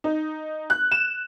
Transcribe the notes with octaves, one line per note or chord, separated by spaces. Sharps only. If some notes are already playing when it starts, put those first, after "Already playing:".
D#4
F#6
E7